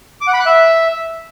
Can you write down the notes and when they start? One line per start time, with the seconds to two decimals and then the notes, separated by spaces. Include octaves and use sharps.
0.21 D6
0.27 F#5
0.33 B5
0.40 F#6
0.46 E5